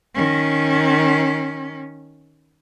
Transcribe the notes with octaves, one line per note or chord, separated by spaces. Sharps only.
D#3 C#4